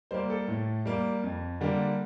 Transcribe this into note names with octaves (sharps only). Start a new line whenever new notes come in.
G3 A#3 C5
A4
A2
G3 A#3
F2
D3 G3 A#3